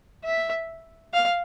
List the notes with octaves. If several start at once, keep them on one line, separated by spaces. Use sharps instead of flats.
E5
F5